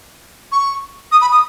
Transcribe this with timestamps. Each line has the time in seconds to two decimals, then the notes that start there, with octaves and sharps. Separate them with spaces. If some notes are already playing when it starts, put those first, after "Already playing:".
0.52 C#6
1.12 D#6
1.21 B5
1.32 D#6